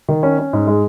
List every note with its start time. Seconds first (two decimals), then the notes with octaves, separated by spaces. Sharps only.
0.08 D#3
0.23 C#4
0.39 C#4
0.53 G#2
0.67 G#3